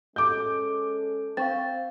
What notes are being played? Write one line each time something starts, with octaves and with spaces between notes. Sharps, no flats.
G#3 C#4 A4 D6 G6
C4 F5 C#6 A6